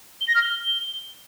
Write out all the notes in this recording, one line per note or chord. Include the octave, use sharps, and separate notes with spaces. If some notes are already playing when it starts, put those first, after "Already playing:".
G7
A#6
F6
G7